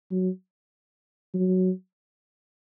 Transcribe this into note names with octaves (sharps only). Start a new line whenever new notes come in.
F#3
F#3